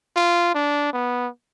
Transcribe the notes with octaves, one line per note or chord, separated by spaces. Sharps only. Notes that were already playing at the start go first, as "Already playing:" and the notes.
F4
D4
B3